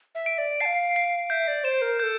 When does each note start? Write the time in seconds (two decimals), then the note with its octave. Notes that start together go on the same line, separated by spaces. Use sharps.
0.15 E5
0.26 D7
0.38 D5
0.60 A5 C7
0.65 F5
0.96 C7
1.30 E5 G6
1.48 D5
1.64 C5 E7
1.82 A#4
1.99 A4 A#4 G6